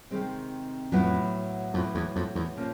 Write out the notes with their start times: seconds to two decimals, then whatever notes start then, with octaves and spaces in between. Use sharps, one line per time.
0.11 C3 D#3 G#3 C4
0.92 F2 A2 F#3 B3 E4
1.74 F2 A2 F#3 B3 E4
1.95 E2
2.16 F2
2.35 E2
2.57 A#2 F3 A#3 C#4